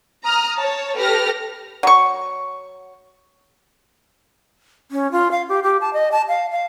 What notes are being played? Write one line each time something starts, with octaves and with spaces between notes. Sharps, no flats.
A#5 D#6 F6
C#5 A5
G4 A4 B4 F6 A#6
F#3 C#6
C#4
F4
F5
G4
G4
A5
D#5
A5
F5
F5